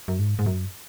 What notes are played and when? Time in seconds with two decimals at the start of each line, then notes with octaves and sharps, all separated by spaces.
0.08 F#2
0.19 G#2
0.39 G#2
0.46 F#2